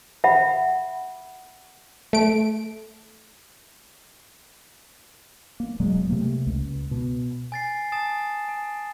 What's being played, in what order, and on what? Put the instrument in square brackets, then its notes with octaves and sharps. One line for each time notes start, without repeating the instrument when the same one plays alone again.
[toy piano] E5 F#5 B5
[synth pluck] A3 D7
[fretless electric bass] A#3
E1 B2 F#3 G#3
C3 A3 A#3
C#2
B2
[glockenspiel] G#5 A6 C7
G#5 A5 D#6 A6 E7
G#5